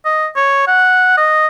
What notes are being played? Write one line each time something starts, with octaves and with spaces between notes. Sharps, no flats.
D#5
C#5
F#5
D#5